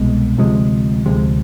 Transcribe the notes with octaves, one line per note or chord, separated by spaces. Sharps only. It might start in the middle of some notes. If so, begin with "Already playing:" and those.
Already playing: C2 B2 G#3
D2 C3 F3 G#3
D2 C3 F3 G#3